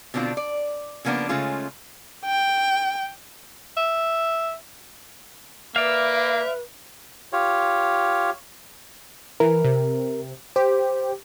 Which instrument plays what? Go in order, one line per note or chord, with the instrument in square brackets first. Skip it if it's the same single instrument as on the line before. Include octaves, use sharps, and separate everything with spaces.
[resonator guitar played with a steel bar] B2 D3 C4 D4 F4
D5
C#3 F3 A#3 B3 D4
C#3 G#3 A3 C#4 F4
[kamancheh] G5
[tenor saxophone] E5
[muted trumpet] A#3 [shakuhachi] B4 [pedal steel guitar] D5 F5 [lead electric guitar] E5
[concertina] F4 G4 C#5
[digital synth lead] E3 [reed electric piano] A#4
[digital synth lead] C3
[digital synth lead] G4 [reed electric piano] C5